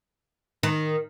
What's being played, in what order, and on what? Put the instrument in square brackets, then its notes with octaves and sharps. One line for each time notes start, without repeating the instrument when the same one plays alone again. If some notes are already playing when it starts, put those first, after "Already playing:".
[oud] D#3